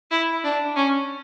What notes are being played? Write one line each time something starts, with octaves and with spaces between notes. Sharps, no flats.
E4
D4
C#4